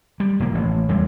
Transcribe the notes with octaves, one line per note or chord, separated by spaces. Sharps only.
G3
F1 A#3
A1
E2 G3 G#3